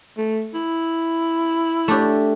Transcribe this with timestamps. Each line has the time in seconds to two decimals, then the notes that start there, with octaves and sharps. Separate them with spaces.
0.18 A3
0.54 E4
1.88 A3 D4 G4